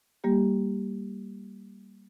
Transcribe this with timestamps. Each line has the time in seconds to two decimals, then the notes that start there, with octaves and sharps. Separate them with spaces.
0.24 G3 A#3 G4